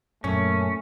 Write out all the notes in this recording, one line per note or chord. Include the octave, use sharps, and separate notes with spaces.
F#2 A#2 A3 C#4